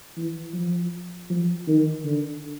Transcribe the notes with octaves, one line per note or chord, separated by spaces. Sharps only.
E3
F3
F3
D#3
D3